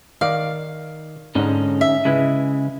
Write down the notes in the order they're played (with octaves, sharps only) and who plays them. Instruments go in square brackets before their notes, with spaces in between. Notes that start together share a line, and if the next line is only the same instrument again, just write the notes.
[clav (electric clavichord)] D#3 D5 [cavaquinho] F5
[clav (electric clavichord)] G#2 [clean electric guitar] D3 C#4 D#4
[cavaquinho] E5
[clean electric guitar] C#3 [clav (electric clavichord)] G#3 E4 B4